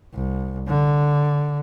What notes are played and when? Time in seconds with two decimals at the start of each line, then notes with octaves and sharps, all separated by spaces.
0.14 C2
0.68 D3